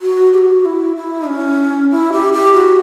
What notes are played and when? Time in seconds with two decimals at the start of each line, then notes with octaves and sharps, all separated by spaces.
0.01 F#4
0.33 G4
0.38 F#4
0.65 E4
0.96 E4
1.27 C#4
1.91 E4
2.12 G4
2.33 G4
2.54 F#4